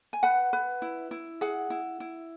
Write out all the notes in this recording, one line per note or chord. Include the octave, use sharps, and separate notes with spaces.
G#5
B4 F#5
B4
E4
E4
G#4 F#5
E4
E4